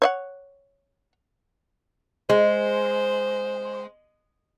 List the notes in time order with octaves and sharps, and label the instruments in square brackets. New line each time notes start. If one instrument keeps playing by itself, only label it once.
[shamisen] C#5 D#5 F#5
[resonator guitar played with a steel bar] G#3 [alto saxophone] C5